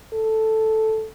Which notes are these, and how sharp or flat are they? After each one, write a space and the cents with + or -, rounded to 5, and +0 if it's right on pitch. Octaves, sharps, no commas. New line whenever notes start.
A4 +0